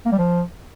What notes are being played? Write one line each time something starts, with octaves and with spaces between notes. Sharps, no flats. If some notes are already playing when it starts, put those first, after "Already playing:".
A#3
G3
F3